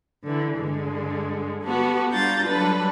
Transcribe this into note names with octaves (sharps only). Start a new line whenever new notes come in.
D3 E3
G2 D3 G#3
B3 F#4 G4 A4 B4
G3 D4 F4 A#5 G6 A6
D3 F#3 G3 D4 A4 B4